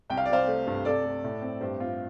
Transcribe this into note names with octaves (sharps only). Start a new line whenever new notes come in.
C2 G5
F5
D5
C3 C5 F5
A3
G2
C3 A4 D5
A3
A2
C4
G2 G4 C5
C4 F4